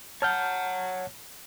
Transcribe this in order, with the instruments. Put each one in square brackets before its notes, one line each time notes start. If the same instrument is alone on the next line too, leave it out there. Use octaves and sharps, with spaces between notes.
[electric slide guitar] C#5 F#5 [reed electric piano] A5 F6 G6